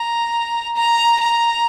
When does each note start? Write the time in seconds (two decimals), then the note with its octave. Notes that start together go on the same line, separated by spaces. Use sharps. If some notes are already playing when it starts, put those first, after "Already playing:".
Already playing: A#5
0.76 A#5
1.20 A#5